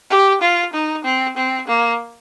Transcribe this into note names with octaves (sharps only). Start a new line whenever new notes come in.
G4
F4
D#4
C4
C4
A#3